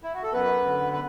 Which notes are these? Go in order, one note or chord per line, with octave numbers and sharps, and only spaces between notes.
E4
F#4
A4
F#2 B3 B4
D3
B4